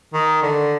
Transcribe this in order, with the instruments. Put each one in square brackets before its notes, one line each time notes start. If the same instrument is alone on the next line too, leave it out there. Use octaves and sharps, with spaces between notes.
[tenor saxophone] D#3
D3